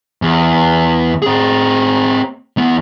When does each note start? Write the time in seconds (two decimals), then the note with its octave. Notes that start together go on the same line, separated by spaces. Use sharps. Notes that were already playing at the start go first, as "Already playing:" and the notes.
0.22 E2
1.22 C4 G#4
2.57 E2 B3